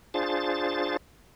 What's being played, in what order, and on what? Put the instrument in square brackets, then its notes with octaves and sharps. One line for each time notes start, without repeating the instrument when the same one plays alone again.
[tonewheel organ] D4 F4 G#4 C5 A6